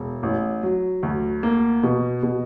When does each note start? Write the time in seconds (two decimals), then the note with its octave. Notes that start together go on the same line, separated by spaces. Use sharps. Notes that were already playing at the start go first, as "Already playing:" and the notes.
Already playing: E1
0.23 A1
0.63 F#3
1.03 D2
1.43 A#3
1.83 B2
2.23 B2